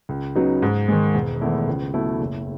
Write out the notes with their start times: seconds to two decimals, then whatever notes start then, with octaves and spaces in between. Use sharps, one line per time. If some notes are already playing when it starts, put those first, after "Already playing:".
0.09 C#2
0.36 C#3 F#3 B3 D#4
0.62 G#2
0.88 D#3 G#3
1.14 E1
1.41 E2 D#3 A3 E4
1.67 C#2
1.94 B2 F#3 A3 E4
2.20 F#1